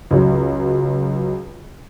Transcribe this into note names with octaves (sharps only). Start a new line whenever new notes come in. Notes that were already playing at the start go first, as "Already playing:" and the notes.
C#2 F#3